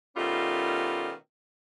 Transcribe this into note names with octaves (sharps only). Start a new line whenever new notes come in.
B2 D#3 G3 A3 C#4 F4